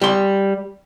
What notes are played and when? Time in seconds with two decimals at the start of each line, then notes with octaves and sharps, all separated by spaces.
0.02 G3 C6